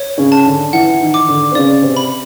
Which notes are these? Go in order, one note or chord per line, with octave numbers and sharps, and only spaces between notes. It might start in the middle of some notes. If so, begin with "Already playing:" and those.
Already playing: C#5
C#3 C#4
A5
D3 D4
E3 E4 F#5
D#3 D#4
D6
D3 D4
C4
C#3 C#4 D5
C3 C4
B5